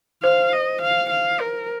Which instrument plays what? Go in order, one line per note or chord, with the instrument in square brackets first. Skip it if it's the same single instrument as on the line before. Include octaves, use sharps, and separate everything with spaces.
[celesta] C5 [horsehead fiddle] F5
[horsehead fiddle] D#5
F5
F5
A#4